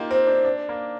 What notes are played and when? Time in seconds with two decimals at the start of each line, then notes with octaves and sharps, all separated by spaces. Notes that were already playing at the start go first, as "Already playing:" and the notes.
Already playing: A#3 D#4 F4 G4
0.11 C4
0.27 D4
0.45 D4
0.69 A#3